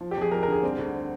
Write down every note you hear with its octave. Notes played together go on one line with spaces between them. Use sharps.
F3
G4
F2 G#4
F2 A#4
A#4
D3 G#4
G3 C4
D2